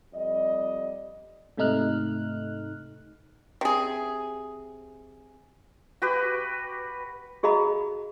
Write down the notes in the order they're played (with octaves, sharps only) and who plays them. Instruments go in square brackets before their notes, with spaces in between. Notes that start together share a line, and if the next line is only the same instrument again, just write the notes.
[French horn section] F2 G3 D5 D#5
[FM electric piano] G#2 C3 A3 D#4 F6 F#6
[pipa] C3 G#4
[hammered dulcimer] F#4 G4 B4
[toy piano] F#4 G#4 D#5 F5 A#5 B5